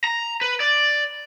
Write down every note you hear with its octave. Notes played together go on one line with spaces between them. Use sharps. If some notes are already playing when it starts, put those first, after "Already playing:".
A#5
B4
D5